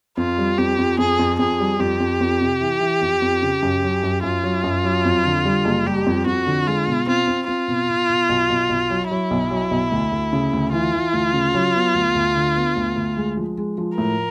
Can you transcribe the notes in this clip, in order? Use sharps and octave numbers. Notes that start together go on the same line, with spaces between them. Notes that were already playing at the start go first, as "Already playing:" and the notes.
F2 F4
G3
F2 G4
F2
F2 G#4
F2
F2 G#4
G3
F2 G4
F2
F2
C3
E3
E3
F2
F2
C#3
F#2
F#3
F#2
F#2 F4
F#3
F#2
F#3
F2
D3
G3
F#1
G3 G4
F2
F2 F#4
D3
G#3 F4
B2
C4 F4
C4
C4 F4
B2
B2
B2
B1
B1
B1
F#3
F#3 E4
B1
F#3
B1
D2
D2
C#3
D2
E3 F4
E3
D2
C#3
F#3
B3
D2
D2
D3
B3
D2
D2
G#3
F3
G#3
F3
A2 A#4